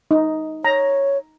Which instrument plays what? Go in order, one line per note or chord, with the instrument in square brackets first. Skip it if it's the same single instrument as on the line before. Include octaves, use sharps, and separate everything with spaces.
[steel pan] D#4
[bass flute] C#5 [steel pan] A#5